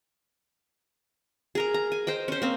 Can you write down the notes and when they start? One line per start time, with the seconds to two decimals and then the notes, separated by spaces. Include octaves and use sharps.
1.55 G#4 A#4 A#5
1.74 A#5
1.92 G#5
2.07 C5 D#5 G5
2.28 C#4 C5
2.42 A#3 C4